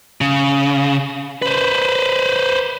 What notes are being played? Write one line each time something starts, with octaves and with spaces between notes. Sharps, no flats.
C#3
B4 C5